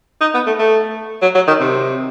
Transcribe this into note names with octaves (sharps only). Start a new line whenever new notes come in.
D#4
B3
A3
A3
F#3
F#3
D#3
C3